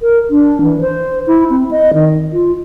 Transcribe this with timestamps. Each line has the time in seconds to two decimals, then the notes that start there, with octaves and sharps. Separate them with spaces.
0.01 A#4
0.30 D4
0.61 E3
0.81 C5
1.27 E4
1.50 C4
1.71 D#5
1.94 D#3
2.33 F4